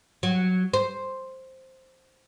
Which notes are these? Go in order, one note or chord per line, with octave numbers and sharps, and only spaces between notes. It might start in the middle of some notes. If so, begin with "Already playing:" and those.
F#3
C5